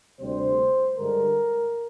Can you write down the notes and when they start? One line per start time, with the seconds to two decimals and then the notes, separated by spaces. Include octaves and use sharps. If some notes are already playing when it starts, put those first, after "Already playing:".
0.20 D2 C3 G3 C5
0.98 G2 D3 G#3 A#4